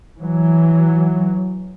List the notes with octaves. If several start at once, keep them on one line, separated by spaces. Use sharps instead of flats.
E3 F#3